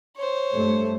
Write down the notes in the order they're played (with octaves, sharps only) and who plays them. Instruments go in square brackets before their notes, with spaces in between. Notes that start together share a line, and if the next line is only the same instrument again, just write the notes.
[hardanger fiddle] C5 C#5
[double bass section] G2 A3